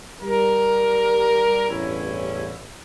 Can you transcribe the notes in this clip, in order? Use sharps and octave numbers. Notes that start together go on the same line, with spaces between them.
G3 A#4
A1 E2 G2 C#4 E4